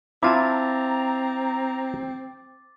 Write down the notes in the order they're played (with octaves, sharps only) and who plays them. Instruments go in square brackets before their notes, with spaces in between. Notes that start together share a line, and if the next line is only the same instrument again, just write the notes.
[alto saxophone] C4 [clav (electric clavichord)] E4 F4 A5 [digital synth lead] A#5 [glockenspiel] D6 A6